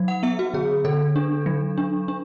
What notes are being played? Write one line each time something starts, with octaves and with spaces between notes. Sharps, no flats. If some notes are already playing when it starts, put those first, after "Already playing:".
Already playing: F#3
F#5
B3 E5
F#4
D3 G#4
D3 A4
D4
F#3
D4
D4